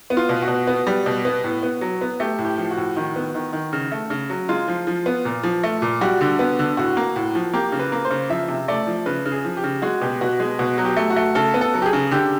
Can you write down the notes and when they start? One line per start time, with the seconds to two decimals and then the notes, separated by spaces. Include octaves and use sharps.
0.10 B3
0.17 F4
0.29 B2
0.42 F#4
0.48 B2
0.67 B3
0.87 G3
1.06 B2
1.25 B3
1.44 A2
1.63 B3
1.81 F#3
2.01 B3
2.20 A3 G4
2.38 A2
2.45 G4
2.58 F3
2.71 F#4
2.77 A2
2.97 D#3
3.16 B3
3.35 D#3
3.53 D#3
3.73 C#3
3.92 A3
4.10 C#3
4.30 F#3
4.49 G#3 F4
4.68 F3
4.87 F3
5.06 B3
5.25 A#2
5.43 F3
5.64 A3
5.82 A#2
6.01 G3 F#4
6.21 D3
6.39 B3
6.59 D3
6.77 A2 F#4
6.97 A#3
7.16 A2
7.35 F3
7.53 A#3 G4
7.72 C#3
7.79 B4
7.92 A#3
8.05 C5
8.11 C#3
8.30 F3 E5
8.49 C3
8.68 A3 D5
8.87 F3
9.06 C#3 B4
9.26 C#3
9.32 G#4
9.45 F3
9.57 G4
9.64 C#3
9.82 G#3 F#4
10.01 B2 G4
10.21 B2 F#4
10.40 G#3
10.59 B2 F#4
10.78 F#3
10.85 G4
10.97 A3
11.10 F#4
11.16 A3
11.35 C#3 A4
11.54 B3
11.61 A4
11.74 F#3
11.82 G4
11.86 G#4
11.93 C#3
12.11 D3 G4